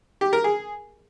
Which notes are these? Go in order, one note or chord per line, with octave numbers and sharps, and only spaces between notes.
G4
A#4
G#4